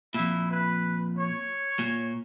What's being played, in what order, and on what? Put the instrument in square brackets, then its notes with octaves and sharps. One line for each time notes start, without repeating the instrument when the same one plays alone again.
[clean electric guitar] F2 A#2 [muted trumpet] E4
[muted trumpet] B4
C#5
[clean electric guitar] A#2